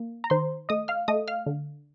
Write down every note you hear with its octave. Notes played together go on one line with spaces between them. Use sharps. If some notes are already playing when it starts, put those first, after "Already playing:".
Already playing: A#3
A#5
D#3 C5 C6
A3 D#5 D#6
F5 F6
A3 D#5 D#6
F5 F6
D3